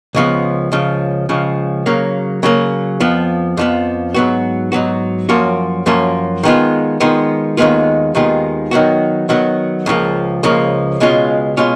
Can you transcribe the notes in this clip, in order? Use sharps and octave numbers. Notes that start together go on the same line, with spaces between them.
C#2 C#3 F3 B3
C#2 C#3 F3
C#2 C#3 F3
C#3 F#3 A#3
C#3 F#3 A#3
F2 F3 B3
F2 F3 B3
G#2 F#3 B3 F#4
G#2 F#3 B3 F#4
F#2 F3 A#3 C#4 F#4
F#2 F3 A#3 C#4 F#4
D#3 G#3 B3 F4
D#3 G#3 B3 F4
D#2 D#3 G#3 B3 F4
D#2 D#3 G#3 B3 F4
D#3 F#3 B3 F#4
D#3 F#3 B3 F#4
C#2 C#3 F3 A#3
C#2 C#3 F3 A#3
C#2 B2 G#3 C#4 F4
B2 G#3 C#4 F4